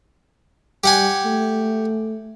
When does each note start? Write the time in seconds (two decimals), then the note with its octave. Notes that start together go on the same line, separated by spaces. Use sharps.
0.84 G3 G4 F#5 G#5
1.25 A3